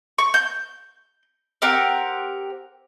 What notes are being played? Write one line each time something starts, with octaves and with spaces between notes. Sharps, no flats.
C#6
G6
C4 G4 A#4 F#5